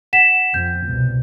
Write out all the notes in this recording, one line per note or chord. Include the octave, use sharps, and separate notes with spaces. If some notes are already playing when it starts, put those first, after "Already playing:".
F#5 B6 E7
F2 G6
C2 B2